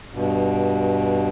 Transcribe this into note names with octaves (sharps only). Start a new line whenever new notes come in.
G2 B2